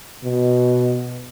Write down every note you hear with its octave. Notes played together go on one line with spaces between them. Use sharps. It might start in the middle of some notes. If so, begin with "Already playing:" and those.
B2